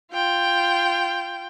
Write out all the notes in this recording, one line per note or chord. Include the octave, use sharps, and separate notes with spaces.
F4 G5